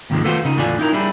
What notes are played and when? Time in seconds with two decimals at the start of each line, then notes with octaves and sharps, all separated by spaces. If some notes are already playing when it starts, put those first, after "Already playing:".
0.10 D#2 G#2 C3 D#3 F3 G#3
0.24 A3 B3 F4 F#4 G#4 C5
0.45 C#3 D#4
0.57 E2 A2 D3 F4 D5 G#5
0.79 D#4 E4 A#4
0.93 G3 D4 E4 G#4